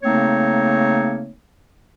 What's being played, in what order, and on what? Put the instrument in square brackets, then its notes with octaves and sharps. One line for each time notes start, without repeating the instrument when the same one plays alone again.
[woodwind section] C#3 A3 A#3 C4 D#4 C#5